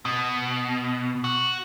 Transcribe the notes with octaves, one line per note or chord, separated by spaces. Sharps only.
B2
F#4